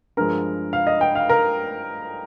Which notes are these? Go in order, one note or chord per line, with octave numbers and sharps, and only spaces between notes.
G2 F3 G#3 A#4
F5
D#5
G5
F5
A#4